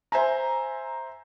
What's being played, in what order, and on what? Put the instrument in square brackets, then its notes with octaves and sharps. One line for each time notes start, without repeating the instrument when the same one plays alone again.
[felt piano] C5 E5 G#5 A#5